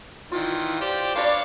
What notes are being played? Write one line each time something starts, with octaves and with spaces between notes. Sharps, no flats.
D#3 E3 F4
G4 C5 D5
D4 B4 C#5 D5 F5 B5